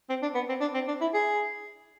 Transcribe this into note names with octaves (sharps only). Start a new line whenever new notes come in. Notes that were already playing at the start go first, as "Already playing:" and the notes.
C4
D4
B3
C4
D4
C4
D4
E4
G#4